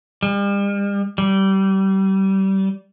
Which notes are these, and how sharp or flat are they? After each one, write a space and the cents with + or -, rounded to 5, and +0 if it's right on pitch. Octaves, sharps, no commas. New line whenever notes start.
G3 +40
G3 -25